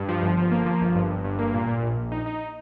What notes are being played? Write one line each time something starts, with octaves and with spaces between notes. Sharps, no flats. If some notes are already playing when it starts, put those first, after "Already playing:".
Already playing: G2
F3
G1
F3
A#3
F3
G1
G2
G1
G2
A#3
A#2
A#2
A#1
A#1
D#4
D#4